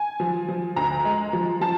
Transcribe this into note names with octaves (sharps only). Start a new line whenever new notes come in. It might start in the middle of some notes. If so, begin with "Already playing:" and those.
Already playing: G#5
F3
F3
D2 A#5
G#3
F3
F3 A5